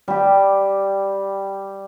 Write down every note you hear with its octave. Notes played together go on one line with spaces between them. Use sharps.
G3 G4